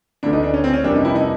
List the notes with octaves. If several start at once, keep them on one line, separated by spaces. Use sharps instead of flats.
D2 C#3 E3 A3 D4
D#4
D4
C#4
C4
C#4
F2 C3 E3 G3 A#3 D4
D#4
E4
D#4